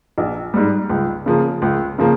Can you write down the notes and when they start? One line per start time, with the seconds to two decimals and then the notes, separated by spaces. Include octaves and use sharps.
0.18 A#1
0.54 G#2 G3
0.90 C#2
1.26 C#3 F3 A#3
1.62 C#2
1.98 C#3 F3 A#3